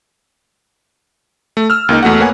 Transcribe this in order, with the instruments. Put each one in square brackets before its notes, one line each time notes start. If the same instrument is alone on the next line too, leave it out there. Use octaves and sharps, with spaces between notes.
[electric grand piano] A3
E6 F6
C#2 A#3 D#4
E2 A3 F#4 F#5
A#3 B3 C#5 F#5 G#5